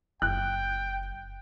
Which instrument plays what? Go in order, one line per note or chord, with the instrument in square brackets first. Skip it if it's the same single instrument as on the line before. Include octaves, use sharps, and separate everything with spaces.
[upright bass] F#1 [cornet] G5 [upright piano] F#6